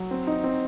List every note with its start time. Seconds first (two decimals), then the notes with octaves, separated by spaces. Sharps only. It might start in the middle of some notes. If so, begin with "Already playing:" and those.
Already playing: F#3
0.11 C4
0.27 D#4
0.44 C4